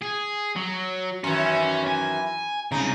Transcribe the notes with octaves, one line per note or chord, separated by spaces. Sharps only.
G#4
F#3
F#2 D#3 E3 C#4
G#5
C2 C#3 D#4